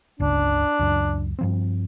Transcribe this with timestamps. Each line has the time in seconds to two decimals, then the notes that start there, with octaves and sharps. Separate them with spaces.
0.20 G1 C#2 C#3 D4
0.79 C#2 F#2
1.39 G2 F3 C4